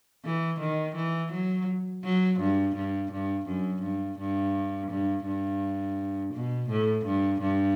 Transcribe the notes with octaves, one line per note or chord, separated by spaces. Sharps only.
E3
D#3
E3
F#3
F#3
G2
G2
G2
F#2
G2
G2
G2
G2
B2
A2
G2
G2